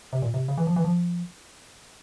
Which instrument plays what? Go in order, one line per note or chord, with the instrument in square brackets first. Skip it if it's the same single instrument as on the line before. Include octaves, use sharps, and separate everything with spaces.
[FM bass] C3
A#2
C3
C#3
E3
F3
E3
F3